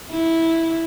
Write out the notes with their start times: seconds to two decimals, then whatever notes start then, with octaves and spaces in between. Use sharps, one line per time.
0.10 E4